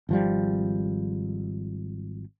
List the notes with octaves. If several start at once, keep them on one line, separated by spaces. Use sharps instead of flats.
G#1 F3 G3